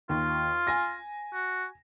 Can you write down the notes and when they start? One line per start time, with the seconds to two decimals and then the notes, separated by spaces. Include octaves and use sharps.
0.09 D#2 F4
0.67 G#5 A#6
1.33 F#4